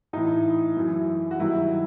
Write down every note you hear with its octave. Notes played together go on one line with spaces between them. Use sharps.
A2 E3 D#4
F#2 E3
F#4
G2 D#3 F#3 E4